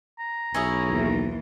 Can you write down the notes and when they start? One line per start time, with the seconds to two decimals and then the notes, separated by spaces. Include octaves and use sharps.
0.19 A#5
0.54 B1 C#4 E4 G#4
0.87 D#2 E3